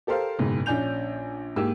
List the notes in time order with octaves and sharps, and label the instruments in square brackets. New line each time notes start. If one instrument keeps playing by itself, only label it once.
[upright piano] G4 A4 A#4 C5 F5
F#1 G#2 B2
A#1 C#4 D4 G#5 G6 F7
G#2 A#3 G4 E6